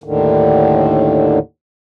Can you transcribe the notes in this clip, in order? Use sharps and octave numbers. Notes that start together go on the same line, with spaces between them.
D#2 A2 D3 D#3